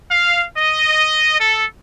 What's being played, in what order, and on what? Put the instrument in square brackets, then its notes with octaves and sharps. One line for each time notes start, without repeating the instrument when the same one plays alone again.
[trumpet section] F5
D#5
A4